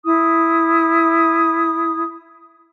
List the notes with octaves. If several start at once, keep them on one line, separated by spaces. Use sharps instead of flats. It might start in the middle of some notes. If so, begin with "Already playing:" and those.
E4 D#6